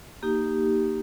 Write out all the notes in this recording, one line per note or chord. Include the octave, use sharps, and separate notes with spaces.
A#3 D#4 G4